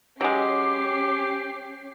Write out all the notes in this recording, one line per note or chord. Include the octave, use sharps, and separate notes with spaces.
F#3 G#3 C#4 G4 D6 C7